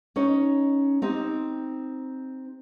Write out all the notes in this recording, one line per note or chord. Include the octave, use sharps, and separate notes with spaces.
C#4 D#4 C#5
C4 D#4 G4